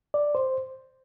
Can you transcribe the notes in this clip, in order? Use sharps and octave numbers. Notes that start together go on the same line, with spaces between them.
D5
C5